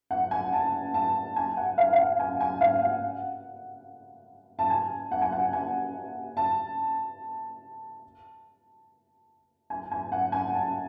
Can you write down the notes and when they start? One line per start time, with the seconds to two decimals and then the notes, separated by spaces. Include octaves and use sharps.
0.11 F#5
0.31 G#5
0.53 A5
0.94 A5
1.36 G#5
1.57 F#5
1.78 F5
1.93 F5
1.98 F#5
2.19 G#5
2.41 G#5
2.61 F5
2.82 F#5
4.59 A5
4.70 G#5
5.11 F#5
5.22 G#5
5.32 F#5
5.53 G#5
6.37 A5
9.70 G#5
9.92 G#5
10.12 F#5
10.32 G#5
10.54 A5